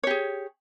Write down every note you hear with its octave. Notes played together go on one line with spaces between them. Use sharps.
G4 G#4 C#5